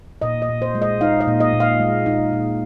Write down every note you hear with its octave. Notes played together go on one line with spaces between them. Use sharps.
A#2 D#5
D#5
A#2
C5
G#3
D#5
D#4 F5
D#5
A#2
D#5
A#2
F5
G#3
D#4
A#2